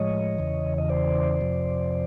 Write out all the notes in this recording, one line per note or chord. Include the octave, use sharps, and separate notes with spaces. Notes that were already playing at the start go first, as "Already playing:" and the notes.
Already playing: A2 F3 G#3 C#5 D#5
E2 C#3 E3
D#5
C5 D5
F2 C3 F3